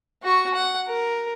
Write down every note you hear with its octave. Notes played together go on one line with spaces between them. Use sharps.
F#4 C#6
F#5
A#4